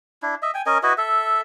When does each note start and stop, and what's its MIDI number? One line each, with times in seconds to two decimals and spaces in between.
0.22 0.35 62
0.22 0.35 64
0.42 0.51 75
0.42 0.51 76
0.54 0.62 79
0.54 0.62 80
0.66 0.78 61
0.66 0.78 70
0.66 0.78 75
0.66 0.78 80
0.83 0.93 64
0.83 0.93 66
0.83 0.93 71
0.83 0.93 75
0.98 1.41 69
0.98 1.41 76